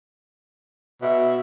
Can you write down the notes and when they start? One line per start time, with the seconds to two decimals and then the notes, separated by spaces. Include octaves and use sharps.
1.02 B2 E5